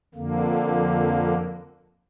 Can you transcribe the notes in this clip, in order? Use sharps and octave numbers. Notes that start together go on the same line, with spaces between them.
F2 D3 A#3